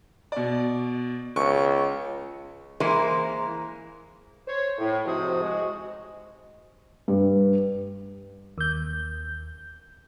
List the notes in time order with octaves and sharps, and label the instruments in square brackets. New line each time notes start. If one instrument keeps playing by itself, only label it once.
[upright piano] B2 D5
[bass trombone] C#2 [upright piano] C#6
[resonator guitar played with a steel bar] E3 G#3 A#3 A#4 C5
[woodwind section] C5 C#5
A2
G#2 C3 F3 F#4 C5 D#6
G#3 F#4
[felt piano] G2
[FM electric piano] D#2 G6